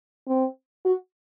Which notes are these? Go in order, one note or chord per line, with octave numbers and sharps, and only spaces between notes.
C4
F#4